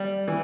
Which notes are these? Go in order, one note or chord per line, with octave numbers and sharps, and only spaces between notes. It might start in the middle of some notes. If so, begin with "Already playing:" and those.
Already playing: G3
E3